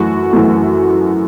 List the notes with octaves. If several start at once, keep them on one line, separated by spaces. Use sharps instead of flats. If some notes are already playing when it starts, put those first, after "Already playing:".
Already playing: F#2 E3 A3 F#4
F#2 E3 A3